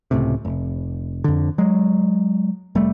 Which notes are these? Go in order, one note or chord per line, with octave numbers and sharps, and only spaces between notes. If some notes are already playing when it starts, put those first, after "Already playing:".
C#2 A2 C3
F1
F2 D3
F#3 G#3
F1 G3 A3